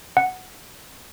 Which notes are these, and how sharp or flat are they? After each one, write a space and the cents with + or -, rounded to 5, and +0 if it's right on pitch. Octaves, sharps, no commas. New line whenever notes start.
F#5 +0